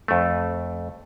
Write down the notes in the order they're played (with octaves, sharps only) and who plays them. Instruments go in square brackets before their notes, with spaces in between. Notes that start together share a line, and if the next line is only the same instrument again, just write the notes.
[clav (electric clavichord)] F2 A3